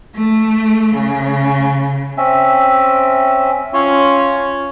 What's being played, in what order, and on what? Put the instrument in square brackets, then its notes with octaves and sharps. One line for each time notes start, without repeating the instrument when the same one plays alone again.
[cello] A3
C#3
[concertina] C4 C#4 E5
[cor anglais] C#4 [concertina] F4 C6